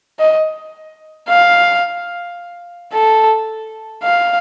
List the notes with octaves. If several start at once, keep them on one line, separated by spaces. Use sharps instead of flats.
D#5
F5
A4
F5